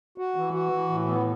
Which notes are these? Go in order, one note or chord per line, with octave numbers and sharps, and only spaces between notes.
F#4
E3
F#4
E3
A2
B3